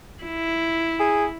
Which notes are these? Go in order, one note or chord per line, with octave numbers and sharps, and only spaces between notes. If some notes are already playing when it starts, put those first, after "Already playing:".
E4
G#4